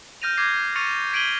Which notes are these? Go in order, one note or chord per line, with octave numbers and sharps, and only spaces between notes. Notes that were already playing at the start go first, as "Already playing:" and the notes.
F6 G6 A#6 D#7 F7
D6 G6 G#6 A#6 C7
G6
C#6 F6 A6 C#7 D#7 F7
G#6 B6 D7 D#7 F#7 G7